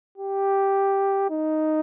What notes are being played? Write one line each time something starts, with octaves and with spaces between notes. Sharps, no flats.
G4
D#4